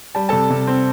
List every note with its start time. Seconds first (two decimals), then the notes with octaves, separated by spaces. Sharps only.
0.15 G3 A5
0.29 C3 A4 A5
0.50 C3
0.67 C4